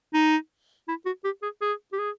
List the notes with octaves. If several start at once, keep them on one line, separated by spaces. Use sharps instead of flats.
D#4
E4
F#4
G4
G#4
G#4
G4
G#4